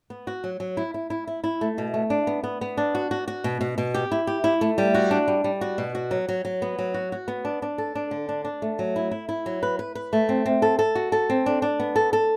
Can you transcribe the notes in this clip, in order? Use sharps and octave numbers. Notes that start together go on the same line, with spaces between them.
B3
F#4
F#3
F#3
E4
E4
E4
E4
E4
A3
B2
A3
D4
B3
B3
B3
D4
F#4
F#4
F#4
B2
B2
B2
G4
E4
G4
E4
A3
G3
F#4
D4
G3
G3
F#4
B2
F#4
F#3
F#3
F#3
B3
F#3
F#4
F#4
B3
D4
D4
A4
D4
D3
D4
D4
A3
F#3
E4
E4
E4
F#3
B4
B4
B4
A3
C4
C4
A4
A4
F#4
A4
C4
D4
D4
B3
A4
A4